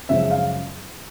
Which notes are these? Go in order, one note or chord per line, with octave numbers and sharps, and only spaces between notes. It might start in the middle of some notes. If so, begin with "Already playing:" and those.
F#2 C#3 F3 G#3 E5
F5